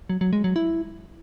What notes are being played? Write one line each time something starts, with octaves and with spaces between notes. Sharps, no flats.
F#3
F#3
G#3
F#3
E4